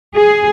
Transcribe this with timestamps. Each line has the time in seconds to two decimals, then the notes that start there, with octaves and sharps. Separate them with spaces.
0.15 G#4